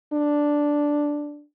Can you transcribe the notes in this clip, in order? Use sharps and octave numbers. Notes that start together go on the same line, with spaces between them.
D4